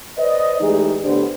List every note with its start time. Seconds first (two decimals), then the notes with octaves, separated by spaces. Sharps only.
0.18 B4 C5 D5 D#5
0.60 E3 G#3 A3 D#4 G4 G#4
1.04 A2 D3 B3 D4 G4 C5